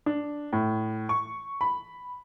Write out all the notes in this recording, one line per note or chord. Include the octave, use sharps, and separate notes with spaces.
D4
A2
C#6
B5